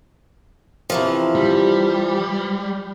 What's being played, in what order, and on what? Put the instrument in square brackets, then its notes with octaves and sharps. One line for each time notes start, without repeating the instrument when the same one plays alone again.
[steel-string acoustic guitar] C3 E3 F3
[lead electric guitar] G3